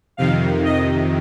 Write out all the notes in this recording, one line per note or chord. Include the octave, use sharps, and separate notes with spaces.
F2 C3 D#3 F5
D#5